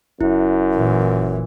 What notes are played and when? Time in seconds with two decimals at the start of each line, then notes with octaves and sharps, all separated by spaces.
0.21 F#1 F#2 E4
0.74 A#2 E3